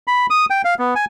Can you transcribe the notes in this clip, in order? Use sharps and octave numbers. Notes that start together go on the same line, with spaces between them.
B5
D#6
G5
F5
B3
G#5